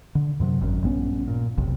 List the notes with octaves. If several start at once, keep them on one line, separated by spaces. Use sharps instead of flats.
D3
F#2 C3 F#3
G#1 F#2
A#1 G2 B3 C#4
A#2
F1 B1 C3